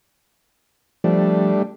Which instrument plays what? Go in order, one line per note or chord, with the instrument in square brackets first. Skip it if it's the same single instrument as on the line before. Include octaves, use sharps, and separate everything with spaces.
[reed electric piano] F3 [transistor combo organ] G3 A3 D4